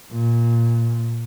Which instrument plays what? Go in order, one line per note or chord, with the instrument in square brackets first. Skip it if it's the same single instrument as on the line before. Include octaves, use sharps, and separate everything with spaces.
[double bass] A#2